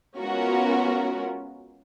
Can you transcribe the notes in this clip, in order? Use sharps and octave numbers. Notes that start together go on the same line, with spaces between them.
G#3 B3 C#4 F4 F#4 A#4